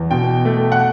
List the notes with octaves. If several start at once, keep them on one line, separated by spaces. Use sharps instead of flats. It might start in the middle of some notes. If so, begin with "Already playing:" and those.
Already playing: E2
B2 G5
A3
F#5